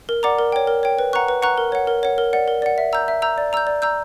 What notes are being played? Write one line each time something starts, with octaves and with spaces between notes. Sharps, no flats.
A#4
D5 F#5 A#5 D6
A#4
C#5 G5
A#4
C#5 G5
B4
F#5 A#5 C#6 F#6
B4
F#5 A#5 C#6 F#6
A#4
C#5 F#5
A#4
C#5 F#5
A#4
D5 F#5
A#4
D5 F#5
E5
A#5 E6 G6
E5
A#5 E6 G6
D5
A#5 E6 G6
D5
A#5 E6 G6